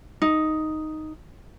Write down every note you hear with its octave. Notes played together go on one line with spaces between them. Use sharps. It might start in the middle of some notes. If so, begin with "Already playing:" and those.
D#4